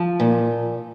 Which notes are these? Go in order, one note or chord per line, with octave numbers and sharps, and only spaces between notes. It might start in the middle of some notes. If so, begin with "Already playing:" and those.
Already playing: F3
A#2